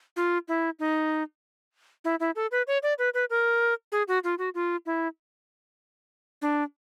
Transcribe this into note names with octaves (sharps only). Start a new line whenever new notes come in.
F4
E4
D#4
E4
E4
A4
B4
C#5
D5
B4
B4
A#4
G#4
F#4
F4
F#4
F4
E4
D4